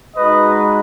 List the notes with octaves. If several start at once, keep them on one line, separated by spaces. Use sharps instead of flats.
G#3 D#4 F#4 B4 D#5